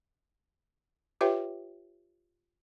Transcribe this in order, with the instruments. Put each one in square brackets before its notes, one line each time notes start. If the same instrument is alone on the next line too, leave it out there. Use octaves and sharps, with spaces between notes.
[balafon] F4 G4 B4 C#5 E5 G5